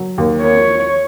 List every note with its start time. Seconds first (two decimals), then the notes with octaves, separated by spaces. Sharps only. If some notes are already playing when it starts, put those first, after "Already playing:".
Already playing: F#3
0.18 D#2
0.42 A#3 C#5